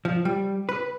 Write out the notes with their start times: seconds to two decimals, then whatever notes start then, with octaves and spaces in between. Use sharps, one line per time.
0.05 F3
0.25 G3
0.69 B4